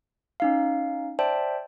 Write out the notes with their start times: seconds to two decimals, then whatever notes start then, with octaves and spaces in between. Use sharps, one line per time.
0.40 C#4 D#4 F5
1.19 C5 D5 E5 G5 A5